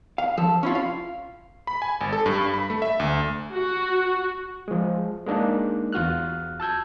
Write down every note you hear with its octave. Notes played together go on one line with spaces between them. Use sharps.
F5
F3 A4
C#4 E4 F4
F5
B5
G#5
G#1
A4
G2
G2
B5
A3
E5
D2
F#4
F3 G#3
G#3 A#3 D4 D#4
E2 F4 F#4 F6 F#6
A5 E6 G6 G#6